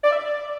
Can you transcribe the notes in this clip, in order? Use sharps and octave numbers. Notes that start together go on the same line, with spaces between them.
D5
E5
D5